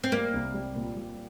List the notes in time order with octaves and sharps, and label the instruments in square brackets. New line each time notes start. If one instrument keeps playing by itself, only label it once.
[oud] C4
[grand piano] G3 [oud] A#3
[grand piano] C2
G3
A#2
G3